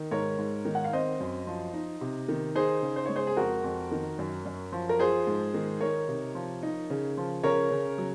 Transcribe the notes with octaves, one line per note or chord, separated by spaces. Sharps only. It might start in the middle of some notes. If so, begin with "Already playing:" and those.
Already playing: D#3
G#2 A#4 C#5
G#2
D#3
F#5
F5
C4 C5 D#5
F#2
F3
D#4
C3
D#3
D#4 G#4 C5
C#3
C5
G#3 C#5
G#4 C5
G#4
F2 F#4 A#4
F2
D#3
F#2
F#2
F3
A#4
F4 G#4 C5
G#2
D#3
D#4 A#4 C#5
C3
F3
D#4
C#3
F3
C#3 A#4 C#5
C#3
F#3